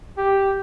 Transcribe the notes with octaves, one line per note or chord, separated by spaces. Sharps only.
G4